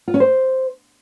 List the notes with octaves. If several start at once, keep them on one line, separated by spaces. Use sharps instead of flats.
F4
C#4
C5